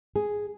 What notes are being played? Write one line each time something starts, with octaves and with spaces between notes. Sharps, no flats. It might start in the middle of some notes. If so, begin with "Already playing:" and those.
G#4